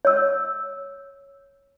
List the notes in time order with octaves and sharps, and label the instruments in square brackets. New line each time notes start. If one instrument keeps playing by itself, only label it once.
[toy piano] C#5 E6